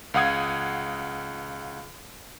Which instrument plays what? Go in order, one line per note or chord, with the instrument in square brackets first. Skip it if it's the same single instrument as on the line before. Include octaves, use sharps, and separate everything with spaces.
[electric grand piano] C#2 F5 F#5 D#6 G#6